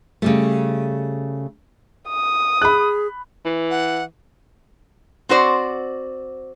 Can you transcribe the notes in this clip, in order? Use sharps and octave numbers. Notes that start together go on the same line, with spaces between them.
C#3 G3 A3
D#6
G#4 B5 F#6
E3
F#5
C4 F#4 C5 D5